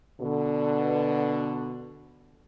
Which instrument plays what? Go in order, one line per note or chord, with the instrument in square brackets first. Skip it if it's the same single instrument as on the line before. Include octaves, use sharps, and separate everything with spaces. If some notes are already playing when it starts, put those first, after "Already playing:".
[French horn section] B2 D3